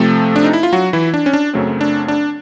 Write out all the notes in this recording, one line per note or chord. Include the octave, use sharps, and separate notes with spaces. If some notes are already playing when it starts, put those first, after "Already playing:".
Already playing: C3 F3 A3 C4 A4
D4
D#4
E4
F4
F#3 F#4
E3 E4
D4
C#4
D4
F#2 C#3 F#3 A3 C4
D4
D4